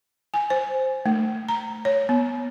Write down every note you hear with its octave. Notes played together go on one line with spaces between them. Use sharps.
G#5
C5
A3
A#5
C#5
B3